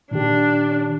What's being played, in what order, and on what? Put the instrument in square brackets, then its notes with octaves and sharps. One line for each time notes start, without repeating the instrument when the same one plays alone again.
[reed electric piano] A#2 D#3 G4 [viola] D4